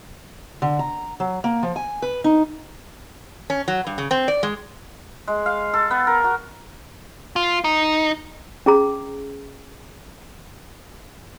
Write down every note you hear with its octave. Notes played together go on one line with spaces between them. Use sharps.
D3
A#5
F#3
A#3
F3
G#5
B4
D#4
C#4
F#3
G2
C#3
C4
D5
G#3
G#3
F5
A4
B3
A#4
F#4
F4
D#4
C#4 G#4 A#5